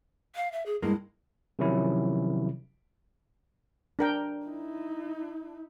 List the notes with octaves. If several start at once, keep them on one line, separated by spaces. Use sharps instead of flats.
F5
E5
G#4
G2 G#3 A#3 E4
C3 D#3 F3 F#3 C#4 E4
D4 A#4 G5
D#4 E4